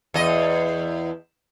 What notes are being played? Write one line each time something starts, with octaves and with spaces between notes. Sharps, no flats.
E2 D#5